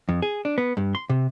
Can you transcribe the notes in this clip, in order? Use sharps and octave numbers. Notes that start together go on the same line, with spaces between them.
F2
G#4
D4
B3
G2
C6
C3